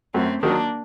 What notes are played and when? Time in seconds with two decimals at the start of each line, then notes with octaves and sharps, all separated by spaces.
0.14 F#2 A3 C4
0.42 D#3 F#3 A#3 D4